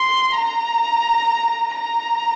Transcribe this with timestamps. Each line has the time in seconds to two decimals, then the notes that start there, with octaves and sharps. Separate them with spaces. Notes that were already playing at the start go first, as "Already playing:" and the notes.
Already playing: C6
0.35 A#5
1.75 A#5